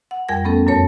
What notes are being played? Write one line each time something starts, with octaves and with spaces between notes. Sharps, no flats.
F#5
F2 G3 A#4 G5 G#6 A#6
A3 B3 C#4 A4
F#2 A#2 A#4 C#5 A5